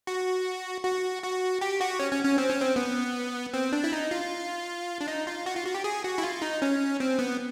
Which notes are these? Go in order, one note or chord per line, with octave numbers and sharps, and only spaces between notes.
F#4
F#4
F#4
G4
F#4
C#4
C#4
C#4
C4
C#4
C4
B3
C4
D4
E4
D#4
F4
D4
D#4
F4
F#4
F4
F#4
G4
G#4
F#4
E4
F4
D#4
C#4
C4
B3